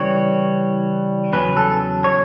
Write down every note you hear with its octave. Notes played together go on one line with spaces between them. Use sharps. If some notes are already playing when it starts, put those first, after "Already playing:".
Already playing: C#3 E3 G3 C#5
E2 C#3 F#3 C#4 B4
A4
C#5